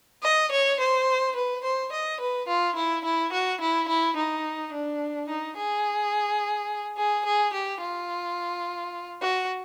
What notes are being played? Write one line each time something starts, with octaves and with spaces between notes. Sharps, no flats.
D#5
C#5
C5
B4
C5
D#5
B4
F4
E4
E4
F#4
E4
E4
D#4
D4
D#4
G#4
G#4
G#4
G4
F4
F#4